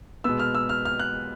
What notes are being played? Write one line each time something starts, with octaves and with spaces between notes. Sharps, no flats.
B2 G#3 B3 E6
F6
E6
F6
F6
F#6